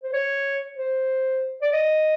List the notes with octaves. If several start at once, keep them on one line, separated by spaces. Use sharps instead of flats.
C5
C#5
C5
D5
D#5